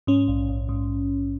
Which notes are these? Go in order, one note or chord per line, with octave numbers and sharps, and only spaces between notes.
G#2 C#4
A#1
A#1
G#2